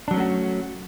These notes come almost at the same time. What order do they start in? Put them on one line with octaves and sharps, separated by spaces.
D4 F#3 C#4 A3 F#4